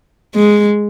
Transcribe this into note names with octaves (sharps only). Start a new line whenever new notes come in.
G#3